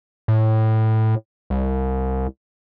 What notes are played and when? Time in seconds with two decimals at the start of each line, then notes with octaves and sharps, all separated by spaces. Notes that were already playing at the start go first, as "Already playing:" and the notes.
0.28 A2
1.50 C2